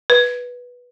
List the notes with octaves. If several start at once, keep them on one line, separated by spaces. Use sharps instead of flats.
B4